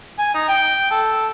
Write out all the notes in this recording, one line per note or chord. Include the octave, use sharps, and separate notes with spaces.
G#5
D#4
G5
A4